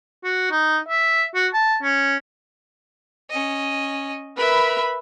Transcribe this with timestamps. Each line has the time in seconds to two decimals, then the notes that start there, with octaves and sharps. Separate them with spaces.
0.24 F#4
0.51 D#4
0.89 E5
1.35 F#4
1.54 A5
1.83 C#4
3.30 C#4 D#5
4.37 A#4 B4 E5 B5